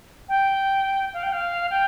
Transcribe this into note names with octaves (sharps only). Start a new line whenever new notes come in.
G5
F5
G5
F5
G5